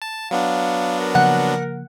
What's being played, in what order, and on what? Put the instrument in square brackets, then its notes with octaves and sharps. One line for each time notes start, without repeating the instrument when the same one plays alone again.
[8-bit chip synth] A5
[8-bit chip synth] F#3 B3 D4 [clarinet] F5
[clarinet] A#4
[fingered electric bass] C#3 F3 A#3 [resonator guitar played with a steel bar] F#5